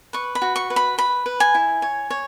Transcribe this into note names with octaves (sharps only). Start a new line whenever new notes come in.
B4 C#6
B5
F#4
C#6
B4
B5
B4 B5
B4
G#5
E4
C#5
C#5